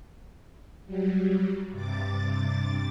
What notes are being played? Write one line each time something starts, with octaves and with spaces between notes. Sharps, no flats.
F#3 G3
G2 C3 D6 A6